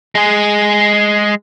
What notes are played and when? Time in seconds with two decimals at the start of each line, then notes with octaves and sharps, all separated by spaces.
0.15 G#3 G#4